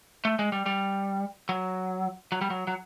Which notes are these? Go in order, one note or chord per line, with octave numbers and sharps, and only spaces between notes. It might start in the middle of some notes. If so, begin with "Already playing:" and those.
A3
G#3
G3
G3
F#3
F#3
G3
F#3
F#3